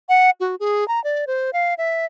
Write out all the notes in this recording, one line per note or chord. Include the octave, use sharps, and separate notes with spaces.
F#5
F#4
G#4
A#5
D5
C5
F5
E5